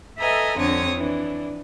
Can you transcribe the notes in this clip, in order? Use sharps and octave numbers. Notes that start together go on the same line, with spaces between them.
A4 B4 D#5 E5 G#5 A#5
F2 D3 C4 D4 C#5 D#6
E3 D4